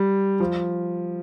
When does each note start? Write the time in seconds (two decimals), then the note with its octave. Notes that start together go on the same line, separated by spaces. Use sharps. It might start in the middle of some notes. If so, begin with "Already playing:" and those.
Already playing: G3
0.40 F3